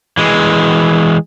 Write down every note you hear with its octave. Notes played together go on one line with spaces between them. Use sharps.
E3 G#3